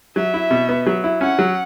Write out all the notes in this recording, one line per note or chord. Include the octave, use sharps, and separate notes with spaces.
F#3 E5
E4
B2
B3
F#3
E4
C#4 F#5
F#3